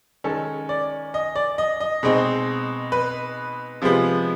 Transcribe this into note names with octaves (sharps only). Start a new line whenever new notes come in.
D#3 G#3 C#4 A4
D5
D#5
D5
D#5
D#5
B2 G#3 C4 D#4
B4
C3 F3 G#3 B3